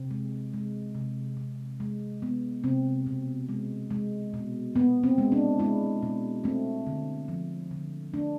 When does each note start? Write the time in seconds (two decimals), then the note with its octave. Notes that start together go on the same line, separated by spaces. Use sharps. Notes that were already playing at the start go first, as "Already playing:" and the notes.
Already playing: C3 C4
0.11 G#3
0.53 G#3
0.95 C3
1.37 C3
1.80 G#3
2.22 G#3 B3
2.64 C3 C4
3.07 B2
3.49 G#3
3.90 G#3
4.34 B2
4.76 B2 B3
5.04 C4
5.18 G#3
5.32 D4
5.59 G#3 E4
6.02 B2
6.44 A3 C4
6.87 D3
7.28 F3
7.71 D3
8.14 A3 D4